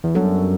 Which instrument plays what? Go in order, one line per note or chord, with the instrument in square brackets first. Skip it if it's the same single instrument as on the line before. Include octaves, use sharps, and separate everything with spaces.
[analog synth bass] E2
[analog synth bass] F#2 [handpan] G3 B3 D4 F#4 A4